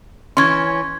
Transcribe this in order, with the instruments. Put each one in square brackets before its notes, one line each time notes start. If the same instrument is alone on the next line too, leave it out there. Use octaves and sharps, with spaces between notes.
[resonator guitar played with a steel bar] E3 C#4 [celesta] C6 C#6 G#6